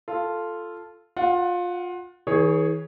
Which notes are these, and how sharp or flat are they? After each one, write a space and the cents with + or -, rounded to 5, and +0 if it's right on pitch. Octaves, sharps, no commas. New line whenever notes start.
F4 -5 A4 +0
F4 +25 F#5 +0
E3 -45 G#4 +5 C#5 +0